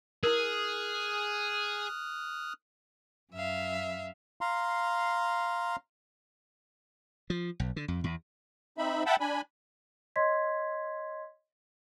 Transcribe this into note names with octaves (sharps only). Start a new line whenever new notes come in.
E4 G#4 A#4 D#6 F6 F#6
F#2 E5 F5
F5 A#5 C6
F3
B1
D3
F2
E2
C4 D#4 E5 B5
E5 F#5 G5 A5 B5
D4 G#5 B5
C#5 D#5 C6 G#6 B6